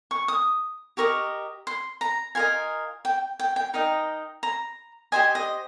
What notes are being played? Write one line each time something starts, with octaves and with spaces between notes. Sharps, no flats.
C#6
D#6
G4 A#4 D#5 C#6
C6
A#5
F4 A#4 D#5 G#5
G5
G5
G5
D#4 A#4 D#5 G5
A#5
G4 C5 D#5 G#5
D#5